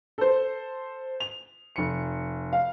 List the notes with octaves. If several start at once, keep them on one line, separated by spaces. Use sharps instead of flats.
A4 C5
F7
F1 C#7
F5